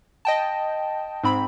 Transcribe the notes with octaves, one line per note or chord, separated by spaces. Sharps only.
D#5 G5 A5
G#2 C4 B5